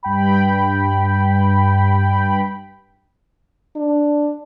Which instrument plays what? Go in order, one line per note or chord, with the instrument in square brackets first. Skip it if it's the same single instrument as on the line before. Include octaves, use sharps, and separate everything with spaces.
[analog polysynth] G2 G5 B5
[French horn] D4